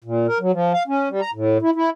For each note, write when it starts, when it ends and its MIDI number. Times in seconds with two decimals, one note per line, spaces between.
0.04 0.27 46
0.28 0.38 70
0.40 0.52 54
0.52 0.73 53
0.73 0.83 77
0.87 1.09 61
1.09 1.21 55
1.21 1.31 82
1.34 1.58 45
1.62 1.71 64
1.75 1.90 64